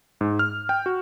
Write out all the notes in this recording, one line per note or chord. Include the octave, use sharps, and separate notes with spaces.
G#2
F6
G5
F#4